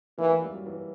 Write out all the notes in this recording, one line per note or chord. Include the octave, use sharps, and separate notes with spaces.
E3 A#3
A#3
G3
F#3
E3